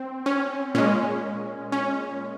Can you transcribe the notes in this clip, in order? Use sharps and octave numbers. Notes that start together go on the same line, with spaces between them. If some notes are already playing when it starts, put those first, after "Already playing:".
Already playing: C4
C#4
A#2 G#3 C#4
C#4